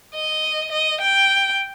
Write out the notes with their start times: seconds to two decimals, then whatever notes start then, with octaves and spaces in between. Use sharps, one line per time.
0.15 D#5
0.72 D#5
1.01 G5